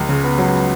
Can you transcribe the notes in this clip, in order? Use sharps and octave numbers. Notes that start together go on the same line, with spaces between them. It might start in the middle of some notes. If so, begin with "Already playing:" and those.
Already playing: C#2
C#3
B3
F#3